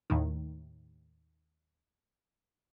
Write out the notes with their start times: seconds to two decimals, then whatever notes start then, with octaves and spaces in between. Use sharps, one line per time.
0.10 D#2 A2 D#3